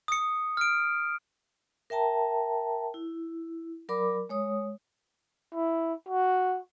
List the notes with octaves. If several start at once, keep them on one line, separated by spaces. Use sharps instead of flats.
D#6 C#7
F6 D7
A#4 E5 G5 A5 A#5
E4
F#3 A#4 D5 B5 D6
G#3 C#5 D#6
E4
F#4